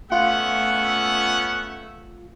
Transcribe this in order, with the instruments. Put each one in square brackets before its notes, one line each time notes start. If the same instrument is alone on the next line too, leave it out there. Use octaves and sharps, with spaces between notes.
[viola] A3 E5 [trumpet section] B3 C#4 F#5 [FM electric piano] F4